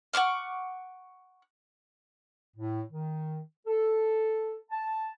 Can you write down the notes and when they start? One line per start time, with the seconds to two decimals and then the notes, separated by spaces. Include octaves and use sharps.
0.13 F#5 C#6 D6 F6
2.56 A2
2.91 D#3
3.67 A4
4.71 A5